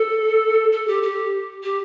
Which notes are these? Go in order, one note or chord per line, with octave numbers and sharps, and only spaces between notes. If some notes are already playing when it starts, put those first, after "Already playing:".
Already playing: A4
A4
G4
G4
G4